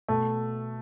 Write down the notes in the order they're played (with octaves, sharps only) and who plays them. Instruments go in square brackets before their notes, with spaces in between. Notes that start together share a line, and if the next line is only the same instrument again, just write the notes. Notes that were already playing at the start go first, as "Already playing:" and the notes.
[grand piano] B2 A3